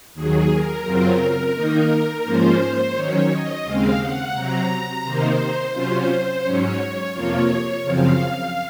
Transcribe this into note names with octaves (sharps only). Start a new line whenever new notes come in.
D#2 D#3 F#3 G#4
A#4
F#2 C#3 F#3 C4 F4
D#3 A#3 D#4
G#2 F3 A#3 C#4 F4 C5
D#3 F#3 C#4 C#5
D#5
D#2 C#3 G#3 C4 F5
F#5
C3 F#3 C4 A#5
C3 D#3 A#3 D#4 C5
C3 F#3 C#4 F4 C5
C5
G#2 F#3 C#4 C#5
F2 C3 F3 A#3 F4 C#5
F#2 C#3 F3 C4 F5